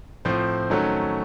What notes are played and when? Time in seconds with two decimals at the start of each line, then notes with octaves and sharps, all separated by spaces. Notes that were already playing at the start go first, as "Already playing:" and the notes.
0.25 A2 F3 C4 C5
0.70 D#3 F#3 A3 C#4